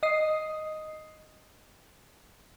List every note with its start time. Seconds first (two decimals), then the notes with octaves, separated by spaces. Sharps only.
0.03 D#5 D#6 C7